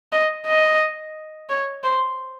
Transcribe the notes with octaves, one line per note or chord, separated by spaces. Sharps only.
D#5
D#5
C#5
C5